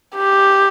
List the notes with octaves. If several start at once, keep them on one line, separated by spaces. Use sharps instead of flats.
G4